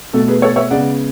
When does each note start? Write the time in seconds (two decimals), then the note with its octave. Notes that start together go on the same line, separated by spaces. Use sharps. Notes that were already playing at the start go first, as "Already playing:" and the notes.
0.13 B2 A3 A4
0.28 G#4 B4
0.42 A4 C#5
0.56 C#5 E5
0.71 C#3 G#3 B3 D5 F#5